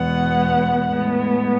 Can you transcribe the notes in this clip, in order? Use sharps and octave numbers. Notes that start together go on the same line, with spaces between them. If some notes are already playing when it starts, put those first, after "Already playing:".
Already playing: E2 B2 G#3 B3 F#5
A2 G#3 B3